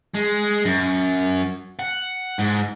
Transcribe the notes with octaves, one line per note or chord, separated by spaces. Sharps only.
G#3
F#2
F#5
G#2